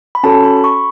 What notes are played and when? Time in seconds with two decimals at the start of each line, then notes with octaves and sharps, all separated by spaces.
0.15 B5
0.24 C#4 F#4 A4 A5
0.44 B5
0.57 B5
0.64 C#6